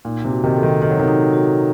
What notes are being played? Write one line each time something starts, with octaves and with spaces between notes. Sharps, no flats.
A#2 D#4
C3
F#4
C3 D#3
A4
C3 D#3
D#3 D#4
F#3
C3 D#3
D#4
F#4